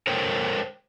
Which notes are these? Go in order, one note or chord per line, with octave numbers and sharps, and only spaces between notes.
A4 A#4 C5 C#5 G5